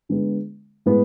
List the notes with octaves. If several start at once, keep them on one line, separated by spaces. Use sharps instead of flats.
D3 G#3 B3
A2 G#3 B3